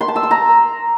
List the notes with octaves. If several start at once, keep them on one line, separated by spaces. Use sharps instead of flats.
C6
A5
E6
C6
A#5